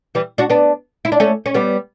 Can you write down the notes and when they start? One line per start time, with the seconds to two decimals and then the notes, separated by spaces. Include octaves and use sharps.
0.15 E3 G3
0.38 D4 F#4
0.50 B3 D4
1.05 E4
1.12 D4
1.20 A3 C#4
1.46 C#4
1.54 G3 B3